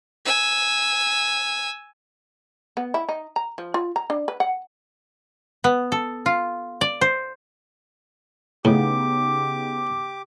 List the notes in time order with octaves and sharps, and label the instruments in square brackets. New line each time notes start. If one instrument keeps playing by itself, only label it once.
[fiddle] G#5 E6
[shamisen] B3
E4
D#4
A#5
F3
F4
A#5
D4
B4
F#5
[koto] B3
A4
F4
D5
C5
[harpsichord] A2 [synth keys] C#3 B3 D#4 [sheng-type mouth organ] G4 D6